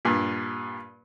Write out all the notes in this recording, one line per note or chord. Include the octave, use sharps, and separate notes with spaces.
G2 A#2